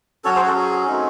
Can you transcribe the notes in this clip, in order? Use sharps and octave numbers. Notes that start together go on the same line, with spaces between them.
F#3 C#4 F#4 A4 C#5
G#4 C5
F#4 A4
G#4
F#3 A3 C4 D#4